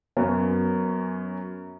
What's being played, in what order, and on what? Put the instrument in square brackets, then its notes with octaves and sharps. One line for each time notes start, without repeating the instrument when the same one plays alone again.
[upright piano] F#2 B3 C#4